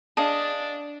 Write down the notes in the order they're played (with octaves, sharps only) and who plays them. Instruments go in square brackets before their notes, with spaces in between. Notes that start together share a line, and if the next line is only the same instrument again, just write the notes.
[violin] D4 [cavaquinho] G#4 D#5 [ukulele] F5 A5